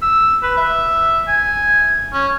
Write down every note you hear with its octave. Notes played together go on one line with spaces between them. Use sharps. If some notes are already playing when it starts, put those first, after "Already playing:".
E6
B4
E5
G#5
C#4